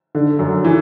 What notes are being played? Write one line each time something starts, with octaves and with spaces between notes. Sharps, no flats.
D3
F#2
E3